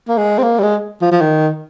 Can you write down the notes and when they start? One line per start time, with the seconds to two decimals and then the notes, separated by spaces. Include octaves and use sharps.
0.08 A#3
0.18 G#3
0.38 C4
0.43 A#3
0.59 G3
0.63 G#3
1.02 F3
1.12 F3
1.21 D#3